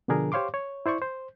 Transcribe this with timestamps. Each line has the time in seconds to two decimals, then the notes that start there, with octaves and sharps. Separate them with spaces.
0.08 B2 D3 F3 D4 G#4 A#4
0.32 G4 C5 C#5 F5 C6 D6
0.54 C#5
0.86 E4 C5 D5 C#6
1.02 C5